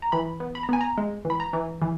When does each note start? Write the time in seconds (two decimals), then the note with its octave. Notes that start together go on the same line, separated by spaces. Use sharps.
0.02 A#5
0.12 E3 B5
0.40 B3
0.55 B5
0.63 A#5
0.69 B3 G#5
0.81 A#5
0.98 G#3
1.25 E3
1.30 B5
1.40 A#5
1.53 E3
1.82 E3